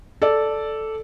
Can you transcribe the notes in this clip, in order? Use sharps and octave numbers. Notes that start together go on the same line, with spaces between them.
A4 D5